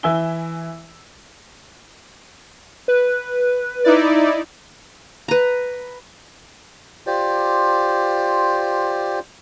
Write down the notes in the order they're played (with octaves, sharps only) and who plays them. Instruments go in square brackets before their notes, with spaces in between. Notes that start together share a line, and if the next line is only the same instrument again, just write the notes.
[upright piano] E3 E4 E5 G#5 E6 G7
[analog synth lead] B4
[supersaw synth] D#4 E4 D5
[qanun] B4 A#5
[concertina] F4 G4 C5 D5